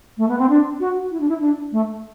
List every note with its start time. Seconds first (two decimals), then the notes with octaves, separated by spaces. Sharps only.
0.18 A3
0.28 B3
0.39 C4
0.49 D4
0.80 F#4
1.11 E4
1.20 D4
1.29 E4
1.41 D4
1.72 A3